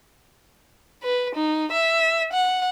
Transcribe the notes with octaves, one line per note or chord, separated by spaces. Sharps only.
B4
D#4
E5
F#5